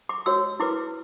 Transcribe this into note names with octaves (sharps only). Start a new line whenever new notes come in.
D6
F#4 C#5 E6
E4 B4 D6